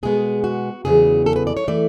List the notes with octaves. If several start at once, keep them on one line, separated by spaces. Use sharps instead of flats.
B2 G#3 B3 G#4
F#4
E2 C#3 F#3 B3 G#4
A4
B4
D5
C#5
E3 A3 D5